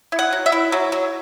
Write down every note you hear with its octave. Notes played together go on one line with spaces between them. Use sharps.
E4
F#5
F#3
E5
E4
F#3
F#3